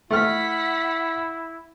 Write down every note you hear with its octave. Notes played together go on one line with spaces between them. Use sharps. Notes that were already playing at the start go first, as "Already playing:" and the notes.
A3 E4 F#5 F6 B6